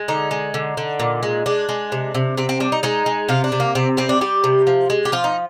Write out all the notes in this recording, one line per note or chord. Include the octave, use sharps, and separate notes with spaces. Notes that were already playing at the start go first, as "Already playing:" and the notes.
Already playing: G#3
D3 D#4
G#3
D3
D3
A#2
G#3
G#3 D4
G#3
C3
C3
C3 C4
C4
G3 D4
D#4
G#3 D#4
G#3
C3 F4
D4
C3
A#3
C3 C4
G3 C4
D4
G3 G4
C3
F3
G#3
G4
F3 F4
D#4